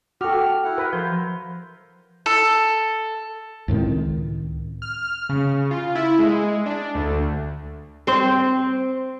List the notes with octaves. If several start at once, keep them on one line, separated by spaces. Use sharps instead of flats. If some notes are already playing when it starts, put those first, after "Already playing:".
F#4 A4 G5 D6 F6
E4 F#5
A#4 B4
F3 C5
A4
C#2 A2 D#3 C4
F6
C#3
F4
E4
G#3
D4
D2
C4 C5